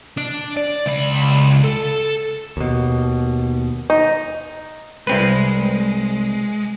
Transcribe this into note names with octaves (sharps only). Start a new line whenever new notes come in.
D4
D5
C#2 B5
A4
D#2 B2
D#4
C2 G#3 C4 B4